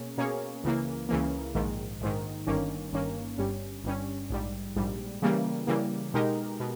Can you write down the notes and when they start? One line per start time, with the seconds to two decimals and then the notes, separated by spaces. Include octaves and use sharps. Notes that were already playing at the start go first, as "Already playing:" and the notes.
Already playing: B2 A#3 C#4 G#4
0.18 B2 A#3 C#4 G#4 C#5
0.63 C#2 C#3 E3 A#3
1.09 C#2 C#3 E3 A#3
1.55 A#1 G#2 D#3
2.01 A#1 G#2 D#3
2.47 G1 G2 D#3 A#3 C#4
2.92 G1 G2 D#3 A#3 C#4
3.38 G1 G2 G3 C#4
3.84 G1 G2 G3 C#4
4.30 A#1 G#2 G3
4.76 A#1 G#2 G3
5.22 C#3 E3 G3 A#3
5.67 C#3 E3 G3 A#3
6.14 B2 G#3 D#4 G4 A#4
6.60 B2